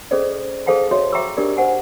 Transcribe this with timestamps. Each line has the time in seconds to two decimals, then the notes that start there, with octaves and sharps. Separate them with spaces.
0.11 C#4 G#4 A4 C5 D5 D#5
0.66 G#4 A4 C5 F5 G5 A5
0.91 F#4 C#5 D#5 E5
1.12 E5 G5 A#5 C#6 D6 E6
1.37 D4 G4 A#4 D5
1.57 C5 F#5 G#5